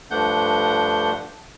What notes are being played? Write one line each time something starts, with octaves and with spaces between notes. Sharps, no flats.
G2 F3 A3 D4 F#5 G6